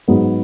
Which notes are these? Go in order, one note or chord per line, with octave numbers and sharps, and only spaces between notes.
G#2 F#3 B3